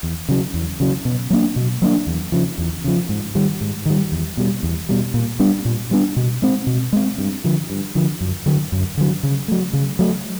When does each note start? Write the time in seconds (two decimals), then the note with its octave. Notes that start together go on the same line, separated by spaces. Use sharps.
0.03 E2
0.29 C#3 F#3
0.54 E2
0.80 C#3 F#3
1.05 B2
1.30 F#3 A#3 D4
1.56 B2
1.82 F#3 A#3 D4
2.07 E2
2.32 C#3 F3
2.58 E2
2.84 C#3 F3
3.09 G#2
3.35 D#3 G3
3.61 G#2
3.86 D#3 G3
4.12 E2
4.37 B2 G3
4.63 E2
4.89 B2 G3
5.14 A#2
5.39 G3 B3 D4
5.65 A#2
5.91 G3 B3 D4
6.16 B2
6.42 G#3 C4
6.67 B2
6.93 G#3 C4
7.18 G2
7.44 D3 F3
7.70 G2
7.95 D3 F3
8.21 F#2
8.46 D3 F#3
8.72 F#2
8.98 D3 F#3
9.23 C#3
9.48 F#3 A3
9.73 C#3
9.99 F#3 A3